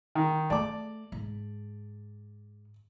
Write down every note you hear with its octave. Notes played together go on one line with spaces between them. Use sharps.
D#3
A3 D5 A5 D6
G#2